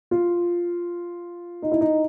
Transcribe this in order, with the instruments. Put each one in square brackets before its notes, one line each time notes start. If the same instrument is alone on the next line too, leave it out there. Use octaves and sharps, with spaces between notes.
[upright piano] F4
D#4
E4
D#4